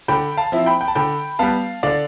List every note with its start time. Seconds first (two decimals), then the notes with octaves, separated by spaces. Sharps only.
0.08 D3 G5 B5
0.37 F5 A5
0.52 F3 C4 E4
0.66 G5 B5
0.81 G5
0.88 A5
0.95 D3 G5 B5
1.39 G3 B3 F5 A5
1.83 D3 D5 F5